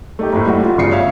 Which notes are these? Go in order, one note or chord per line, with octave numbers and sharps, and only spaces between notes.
A3 D#4 G4
F#1 A2
G3 A3 F#4
F4
G1 C#3 D4 C7 C#7
C#5 E5 F5